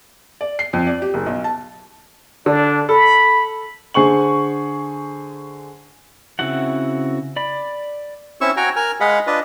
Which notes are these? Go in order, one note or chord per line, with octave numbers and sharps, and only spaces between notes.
D5
C7
F2
D5
G4
F#1
B1
A5
D3 D4
A4 B5
D3 G#4 C5 C#6 F#7
C#3 C4 E4 F#4 F#5
D5 B5
C4 C#4 E4 C#6 E6
F#4 C#5 G5 G#5 A#5
A#4 G#5 F6
G#3 G#4 D#5 F5 F#5 B5
D4 F4 B4 D#5